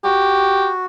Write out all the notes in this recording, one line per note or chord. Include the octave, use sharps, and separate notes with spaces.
F#4 G4